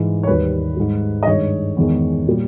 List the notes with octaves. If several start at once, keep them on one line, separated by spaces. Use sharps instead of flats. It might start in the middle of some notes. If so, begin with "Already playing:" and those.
Already playing: G#2 E3 G#3
C#5
D#2 D#3 G3 B4
G#2 G3
D#5
G2 D#3 G#3 C#5
E2 D#3 G#3
A#2 G3